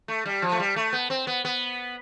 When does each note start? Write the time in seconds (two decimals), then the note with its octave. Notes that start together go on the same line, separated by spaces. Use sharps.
0.08 A3
0.26 G3
0.42 F3
0.52 A3
0.60 G3
0.76 A3
0.93 B3
1.10 C4
1.27 B3
1.45 B3